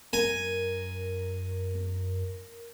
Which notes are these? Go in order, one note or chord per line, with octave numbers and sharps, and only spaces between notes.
F#2 A#4 G#5